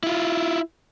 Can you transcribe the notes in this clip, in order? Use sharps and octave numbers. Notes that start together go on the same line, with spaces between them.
E4 F4